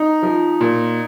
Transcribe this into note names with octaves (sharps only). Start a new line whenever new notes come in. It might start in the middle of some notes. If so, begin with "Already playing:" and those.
Already playing: D#4
F3
A#2